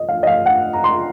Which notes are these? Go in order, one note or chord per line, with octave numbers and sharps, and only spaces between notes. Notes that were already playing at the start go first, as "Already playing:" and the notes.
Already playing: D#5
F5
D#5
F5
F#5
A#5
C6